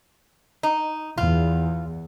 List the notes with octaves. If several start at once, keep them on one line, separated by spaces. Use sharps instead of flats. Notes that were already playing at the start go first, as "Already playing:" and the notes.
D#4
E2 F4